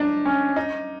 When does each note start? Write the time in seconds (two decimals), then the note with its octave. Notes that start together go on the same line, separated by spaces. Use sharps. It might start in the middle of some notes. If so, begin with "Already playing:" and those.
Already playing: D4 D#4
0.25 C#4
0.56 D#4